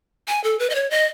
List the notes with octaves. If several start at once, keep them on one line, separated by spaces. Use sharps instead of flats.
G#5
A4
B4
D#5
C#5
D#5